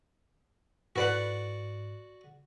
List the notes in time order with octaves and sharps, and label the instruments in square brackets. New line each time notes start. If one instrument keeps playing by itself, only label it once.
[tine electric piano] G#2 [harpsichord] F#4 D5 F#5 [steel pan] A4 B4